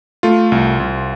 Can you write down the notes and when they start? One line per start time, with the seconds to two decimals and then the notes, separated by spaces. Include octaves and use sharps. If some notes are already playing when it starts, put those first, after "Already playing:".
0.23 A3 F4
0.52 C2
0.80 C2